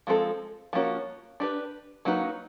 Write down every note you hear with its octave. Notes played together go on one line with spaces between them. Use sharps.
F3 G#3 C4 F4 A4
F3 A#3 C#4 F#4
D4 G4 B4
F#3 A#3 D#4 F#4 B4